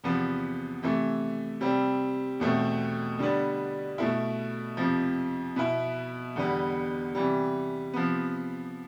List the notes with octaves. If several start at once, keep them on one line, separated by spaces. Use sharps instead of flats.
E2 C3 F3 B3
C3 E3 A3
C3 G3 C4
E2 B2 A3 C4
D3 G3 B3 D4
B2 A3 E4
F2 C3 F3
B2 B3 E4
E2 D3 G3 B3
C3 E3 G3
C3 F3 B3